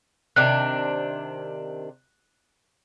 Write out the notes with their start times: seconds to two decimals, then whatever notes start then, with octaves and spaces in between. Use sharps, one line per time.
0.36 C3 D#3 D4 F#6